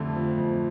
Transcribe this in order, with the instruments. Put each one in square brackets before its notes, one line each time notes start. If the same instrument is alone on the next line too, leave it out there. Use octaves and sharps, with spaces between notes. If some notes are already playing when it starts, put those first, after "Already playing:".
Already playing: [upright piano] F2 D3 F3 A3
F3
F2